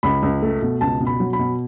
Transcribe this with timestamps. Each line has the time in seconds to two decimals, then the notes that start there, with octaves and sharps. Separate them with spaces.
0.03 C#2 B5
0.22 C#2
0.42 A3
0.62 B2
0.81 C#2 A5
1.00 B2
1.07 B5
1.20 F#3
1.33 B5
1.39 B2